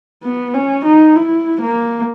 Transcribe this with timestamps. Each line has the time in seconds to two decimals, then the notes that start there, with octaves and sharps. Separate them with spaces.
0.23 B3
0.54 C#4
0.85 D#4
1.16 E4
1.61 A#3